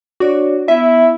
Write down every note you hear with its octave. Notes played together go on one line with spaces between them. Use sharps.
D4 F#4 C#5 D5
B3 E4 E5